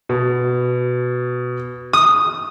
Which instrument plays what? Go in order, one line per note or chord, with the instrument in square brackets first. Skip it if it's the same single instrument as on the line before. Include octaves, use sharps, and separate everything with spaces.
[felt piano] B2
[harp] D#6